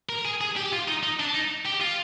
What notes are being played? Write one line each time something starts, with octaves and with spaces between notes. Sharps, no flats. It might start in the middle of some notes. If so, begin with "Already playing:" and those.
A#4
G#4
G#4
G4
F4
D#4
D#4
D4
D#4
G4
F4